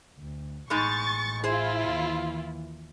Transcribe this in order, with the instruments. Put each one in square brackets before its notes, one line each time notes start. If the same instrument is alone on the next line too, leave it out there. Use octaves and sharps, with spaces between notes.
[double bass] D2
[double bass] A1 [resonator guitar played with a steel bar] B2 G#3 D#4 [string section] C#6 A6
[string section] E4 F4 [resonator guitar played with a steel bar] G#4 C5
[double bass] D#2 E3